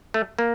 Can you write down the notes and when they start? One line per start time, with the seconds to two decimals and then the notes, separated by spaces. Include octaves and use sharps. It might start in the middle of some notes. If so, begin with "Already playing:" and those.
0.14 A3
0.39 A#3